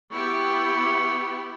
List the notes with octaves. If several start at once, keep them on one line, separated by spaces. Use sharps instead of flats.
B3 E4 G4 C#6